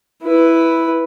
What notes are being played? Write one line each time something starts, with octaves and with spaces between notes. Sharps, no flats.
E4 B4